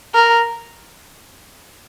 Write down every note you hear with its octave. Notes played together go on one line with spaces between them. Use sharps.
A#4